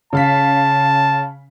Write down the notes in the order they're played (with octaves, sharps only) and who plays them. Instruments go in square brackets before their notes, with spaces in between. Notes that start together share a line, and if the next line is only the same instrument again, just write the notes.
[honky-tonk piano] C#3 F5 B6 [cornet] A5